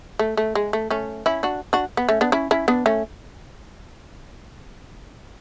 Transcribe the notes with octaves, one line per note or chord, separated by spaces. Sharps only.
A3
A3
G#3
A3
A3 C#4
C#4 E4
D4 F#4
D4 F#4
B3
A3 C#4
B3 D4
C#4 E4
C#4 E4
B3 D4
A3 C#4